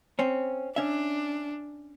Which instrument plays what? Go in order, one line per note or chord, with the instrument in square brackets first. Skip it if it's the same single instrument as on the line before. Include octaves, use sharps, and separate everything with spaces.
[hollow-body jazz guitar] C4 C#4
[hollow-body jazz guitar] C#4 E5 [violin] D4